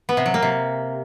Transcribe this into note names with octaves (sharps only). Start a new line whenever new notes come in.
B3
C3
F#3
A#3
C3